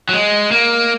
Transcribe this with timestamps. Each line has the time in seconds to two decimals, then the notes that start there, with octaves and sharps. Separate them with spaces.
0.09 F#3
0.13 G#3
0.51 A#3